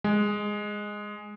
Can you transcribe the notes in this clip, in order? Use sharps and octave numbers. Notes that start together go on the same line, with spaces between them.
G#3